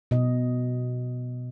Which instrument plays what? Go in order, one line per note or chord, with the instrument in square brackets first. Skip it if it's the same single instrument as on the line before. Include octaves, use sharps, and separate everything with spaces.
[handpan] B2 D#5